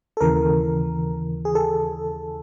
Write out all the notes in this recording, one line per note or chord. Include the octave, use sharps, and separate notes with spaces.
A4
D#2 C#3 E3 A#4
G#4
A4